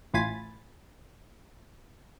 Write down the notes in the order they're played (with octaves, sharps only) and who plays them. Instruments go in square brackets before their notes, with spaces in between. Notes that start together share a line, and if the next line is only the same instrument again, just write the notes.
[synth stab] A1 A2 F4 G#5 B5 A6